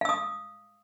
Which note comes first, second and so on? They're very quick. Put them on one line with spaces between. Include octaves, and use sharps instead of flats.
F5 E6 D#6